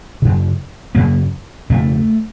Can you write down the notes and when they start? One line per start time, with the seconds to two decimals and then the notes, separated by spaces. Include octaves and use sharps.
0.22 F#2 C#3
0.95 F#2 C#3 A#3
1.70 F2 C#3 A3